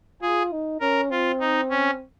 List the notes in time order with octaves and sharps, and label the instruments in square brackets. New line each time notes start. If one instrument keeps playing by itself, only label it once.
[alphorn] F4 [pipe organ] G#4
[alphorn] D#4
[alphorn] C#4 [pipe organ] A#4
[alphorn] C4 [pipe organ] F4
[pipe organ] D#4
C#4